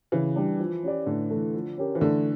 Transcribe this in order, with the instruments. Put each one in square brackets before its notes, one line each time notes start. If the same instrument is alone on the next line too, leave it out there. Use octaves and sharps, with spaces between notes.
[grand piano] C#3 [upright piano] E3
[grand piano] G3 D4
F3
C#4 G4 D5
[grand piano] A2 [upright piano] D3
[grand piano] E3 A3
F3
C#4 G4 A#4
[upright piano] E3
[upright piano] D3 [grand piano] A3